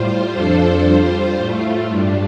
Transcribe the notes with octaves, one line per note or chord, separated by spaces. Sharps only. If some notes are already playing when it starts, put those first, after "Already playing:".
Already playing: A2 G3 F4 C5
F2 F3 D4 A4 C5
G3 F4 C5
A2 A3 F4
G2 G3 D4